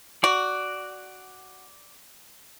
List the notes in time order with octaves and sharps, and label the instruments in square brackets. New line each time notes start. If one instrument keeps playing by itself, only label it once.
[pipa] F#4 [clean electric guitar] D5